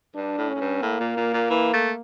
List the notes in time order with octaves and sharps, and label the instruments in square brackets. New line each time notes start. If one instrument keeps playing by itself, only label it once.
[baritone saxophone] G2 [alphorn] D4
[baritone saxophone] A2
[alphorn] C#4
[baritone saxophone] A2
G2
[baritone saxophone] A2 [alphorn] A#3
[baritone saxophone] A#2
A#2
A#2
E3
A3